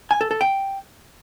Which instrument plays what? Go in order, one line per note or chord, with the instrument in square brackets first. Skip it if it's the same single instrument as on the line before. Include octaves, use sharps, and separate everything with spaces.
[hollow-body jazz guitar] G#5
A4
A4
G5